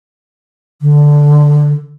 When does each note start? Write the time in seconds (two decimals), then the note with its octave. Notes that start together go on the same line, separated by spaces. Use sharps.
0.82 D3